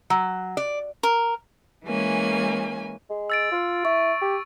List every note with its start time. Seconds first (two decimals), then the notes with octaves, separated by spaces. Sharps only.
0.10 F#3
0.57 D5
1.03 A#4
1.85 E3 G#3 A#3 C#4 G#5
3.10 G#3
3.30 E6 A6 D7
3.52 F4
3.85 E4 C#6
4.22 G4